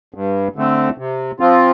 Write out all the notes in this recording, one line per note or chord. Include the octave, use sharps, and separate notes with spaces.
G2
D3 A3 C4
C3
F3 C4 F4